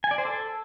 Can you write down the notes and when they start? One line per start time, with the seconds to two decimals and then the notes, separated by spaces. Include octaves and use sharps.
0.04 G#5
0.11 D5
0.18 C5
0.25 A4